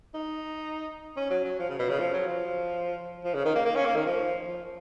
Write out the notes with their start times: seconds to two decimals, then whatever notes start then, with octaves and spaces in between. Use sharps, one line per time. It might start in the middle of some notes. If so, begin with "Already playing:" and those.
0.14 D#4
1.17 C#4
1.31 F#3
1.45 F#3
1.59 F3
1.70 C#3
1.79 B2
1.89 C#3
1.99 F3
2.13 F#3
2.28 F3
3.24 F3
3.34 C#3
3.45 D#3
3.56 A#3
3.66 A#3
3.76 C#4
3.86 A#3
3.96 D#3
4.06 F3
4.48 F3